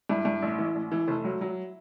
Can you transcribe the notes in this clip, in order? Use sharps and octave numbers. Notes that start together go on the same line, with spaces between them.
G2 E4
G2
A1
E3
A1
E3
F1
F#3
F#3